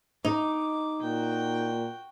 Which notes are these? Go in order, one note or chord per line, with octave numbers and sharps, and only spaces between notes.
D#4 D6
A#2 F#4 G5